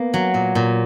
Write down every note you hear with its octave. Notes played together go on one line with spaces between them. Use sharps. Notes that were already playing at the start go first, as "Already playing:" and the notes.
Already playing: A#3 B3
F#3
A#2
A#2